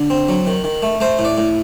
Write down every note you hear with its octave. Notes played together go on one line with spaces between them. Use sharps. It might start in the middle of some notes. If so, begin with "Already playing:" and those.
Already playing: D3
C4
F#3
D#3
D#3
A3
A3 C5
A2
D5
A2